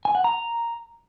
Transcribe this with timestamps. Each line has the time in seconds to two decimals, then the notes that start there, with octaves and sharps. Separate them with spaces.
0.05 G#5
0.15 F#5
0.24 A#5